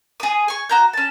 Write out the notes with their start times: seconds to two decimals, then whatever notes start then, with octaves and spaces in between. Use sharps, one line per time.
0.20 G#4 D#6
0.48 G#5 C#6
0.69 F#4 A#5 G6
0.93 C#4 A5